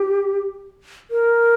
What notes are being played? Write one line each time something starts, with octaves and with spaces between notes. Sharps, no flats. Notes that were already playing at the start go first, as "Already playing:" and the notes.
Already playing: G4
A#4